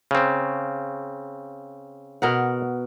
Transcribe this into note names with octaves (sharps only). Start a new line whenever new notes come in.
C#3 C4
B2 A#4 F#5